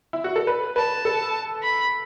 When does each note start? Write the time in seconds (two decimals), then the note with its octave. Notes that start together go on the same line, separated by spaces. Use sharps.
0.13 E4
0.24 F#4
0.36 A4
0.47 B4
0.76 B4 A5
1.05 A4
1.63 B5